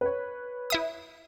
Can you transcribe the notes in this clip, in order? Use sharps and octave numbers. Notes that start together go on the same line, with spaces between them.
B4 C#5
E4 E5 D#6